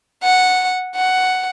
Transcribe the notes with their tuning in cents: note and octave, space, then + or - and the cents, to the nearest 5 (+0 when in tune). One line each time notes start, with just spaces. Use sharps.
F#5 -5
F#5 +5